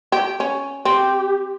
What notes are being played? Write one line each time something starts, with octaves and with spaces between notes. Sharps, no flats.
G4
C#4
C4 G4